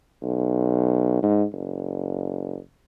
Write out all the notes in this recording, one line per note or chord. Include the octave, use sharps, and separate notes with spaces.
B1
G#2
F#1